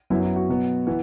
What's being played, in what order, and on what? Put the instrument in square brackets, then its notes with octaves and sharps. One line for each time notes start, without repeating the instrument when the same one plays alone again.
[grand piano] F#2 F#3 B3 E4
E4
F#4
B2 F#3 B3
E3 B3